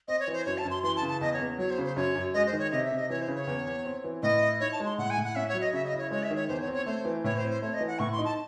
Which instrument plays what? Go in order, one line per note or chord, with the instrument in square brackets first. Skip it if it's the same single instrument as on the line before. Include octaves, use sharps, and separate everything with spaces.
[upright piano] C4 [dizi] D#5
[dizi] C#5
[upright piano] E3
[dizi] C5
[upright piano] F#2 [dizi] C#5
[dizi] A5
[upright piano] F#2
[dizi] C6
[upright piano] E3 [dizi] C6
[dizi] A5
[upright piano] C#3
[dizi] A5
[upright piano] E2 [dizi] D#5
[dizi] C#5
[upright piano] E2
[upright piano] F#3 [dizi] C#5
[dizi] C5
[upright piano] C#3
[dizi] C5
[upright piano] F#2 [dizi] C#5
[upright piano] F#2
[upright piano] G#3 [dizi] D#5
[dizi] C5
[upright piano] D#3
[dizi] C#5
[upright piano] C3 [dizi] D#5
[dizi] E5
[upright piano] C3
[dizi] D#5
[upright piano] E3 [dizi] C#5
[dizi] C5
[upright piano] C#3
[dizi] C#5
[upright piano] E2
E2
C4
E3
[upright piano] A2 [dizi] D#5
[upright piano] E4
[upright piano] D#4 [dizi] C#5
[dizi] A5
[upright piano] G#3
[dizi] C6
[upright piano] A2 [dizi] F#5
[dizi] G#5
[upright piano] A2
[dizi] F#5
[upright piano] C#4 [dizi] E5
[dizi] C#5
[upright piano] F#3
[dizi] D#5
[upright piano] C#3 [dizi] E5
[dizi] D#5
[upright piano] E4
[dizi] C#5
[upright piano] G#3 [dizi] C#5
[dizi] E5
[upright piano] D#3
[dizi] C#5
[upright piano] E2 [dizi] C5
[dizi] C#5
[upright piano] C4
[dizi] C#5
[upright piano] A3 [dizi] C5
[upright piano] E3
[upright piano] A2 [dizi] C#5
[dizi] C5
[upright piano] C4
[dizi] C5
[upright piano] A3 [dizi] C#5
[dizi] D#5
[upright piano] E3
[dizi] F#5
[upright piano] A2 [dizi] C#6
[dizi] C6
[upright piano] D#4
[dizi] A5